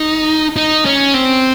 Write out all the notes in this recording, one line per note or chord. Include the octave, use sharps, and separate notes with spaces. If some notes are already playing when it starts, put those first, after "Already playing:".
Already playing: D#4
D#4
C#4
C4